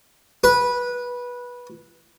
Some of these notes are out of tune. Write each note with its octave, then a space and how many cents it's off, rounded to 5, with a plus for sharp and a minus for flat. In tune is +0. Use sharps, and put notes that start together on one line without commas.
B4 -15